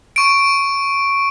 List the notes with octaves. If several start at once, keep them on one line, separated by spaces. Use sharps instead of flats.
C#6 D7